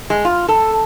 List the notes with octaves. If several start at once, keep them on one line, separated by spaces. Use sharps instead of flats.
G#3
F4
A4